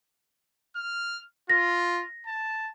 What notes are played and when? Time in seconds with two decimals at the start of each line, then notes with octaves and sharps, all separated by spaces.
0.76 F6
1.50 F4 A#6
2.27 A5